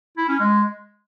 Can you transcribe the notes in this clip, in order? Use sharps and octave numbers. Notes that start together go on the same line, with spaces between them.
E4
C#4
G#3